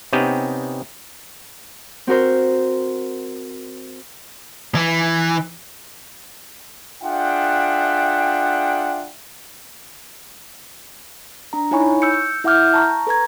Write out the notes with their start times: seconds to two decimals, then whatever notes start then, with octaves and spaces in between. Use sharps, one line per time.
0.13 C3 B3 C#4 D#4 G4
2.07 C4 F#4 A#4 C5
4.75 E3
7.03 D4 F4 G#4 E5 F#5 G5
11.53 D4 A#5
11.71 D#4 E4 C#5 G#5 B5 C#6
12.02 E6 G6 C#7
12.44 E4 E5 F#5 D6 F6 G6
12.74 A5 A#5 C#6
13.07 A4 B4 A#5 G#6